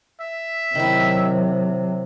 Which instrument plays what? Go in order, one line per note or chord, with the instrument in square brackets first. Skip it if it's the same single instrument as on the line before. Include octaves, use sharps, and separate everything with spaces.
[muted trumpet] E5
[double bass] C3 F#3 [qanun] D#3 E4